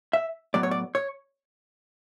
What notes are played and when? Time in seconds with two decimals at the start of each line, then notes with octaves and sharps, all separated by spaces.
0.13 E5
0.54 A2 F#3 B3 D5
0.63 C#5
0.71 D5
0.95 C#5